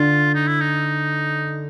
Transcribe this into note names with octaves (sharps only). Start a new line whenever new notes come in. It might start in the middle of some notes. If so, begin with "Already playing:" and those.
Already playing: D3 F4
D#4
E4
D#4